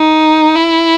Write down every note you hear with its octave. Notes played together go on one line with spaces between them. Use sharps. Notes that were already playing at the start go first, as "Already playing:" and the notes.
Already playing: D#4
E4